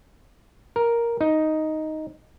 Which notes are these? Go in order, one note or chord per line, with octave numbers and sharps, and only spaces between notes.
A#4
D#4